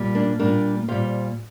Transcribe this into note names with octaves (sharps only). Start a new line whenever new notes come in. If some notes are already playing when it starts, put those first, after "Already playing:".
Already playing: A#2 G3
A#3 D4
A#2 G3 A#3 D4
A#2 G3 C5 F5